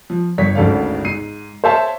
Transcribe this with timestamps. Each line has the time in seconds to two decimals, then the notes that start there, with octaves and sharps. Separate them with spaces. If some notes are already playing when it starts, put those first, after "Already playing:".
0.10 F3
0.38 G1 C#5 B6
0.55 G#1 D2 C#4 A4 D5 F5
1.05 G#2 C7 D#7
1.64 C5 C#5 E5 F5 A5 C6